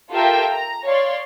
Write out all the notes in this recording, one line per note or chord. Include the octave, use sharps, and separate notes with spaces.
F4 G4 A4 A#4 E5 G5
A#5
C#5 D5 F5 C6